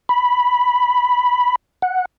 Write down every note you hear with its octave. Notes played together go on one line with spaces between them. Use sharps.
B5
F#5